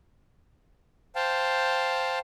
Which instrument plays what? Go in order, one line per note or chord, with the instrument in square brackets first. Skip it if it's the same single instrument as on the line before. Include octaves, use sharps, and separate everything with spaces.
[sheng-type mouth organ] C5 F5 G5 A5